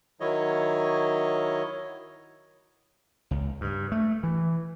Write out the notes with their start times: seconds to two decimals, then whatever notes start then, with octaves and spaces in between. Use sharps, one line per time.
0.20 D#3 F#3 E4 C#5 D#5
3.31 C#2
3.61 G2
3.92 A3
4.23 E3